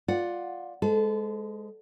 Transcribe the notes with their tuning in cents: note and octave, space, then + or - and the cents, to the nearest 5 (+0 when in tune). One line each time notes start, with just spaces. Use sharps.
F4 +15 D5 +0 F#5 +0
G#3 +0 A4 -20 C5 -40